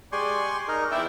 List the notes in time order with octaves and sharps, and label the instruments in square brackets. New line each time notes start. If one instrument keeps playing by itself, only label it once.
[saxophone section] G#3 G4 D5 [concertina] G#5 C6 C#6
[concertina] D#4 A#4
[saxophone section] E2 D4 E4 [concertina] G5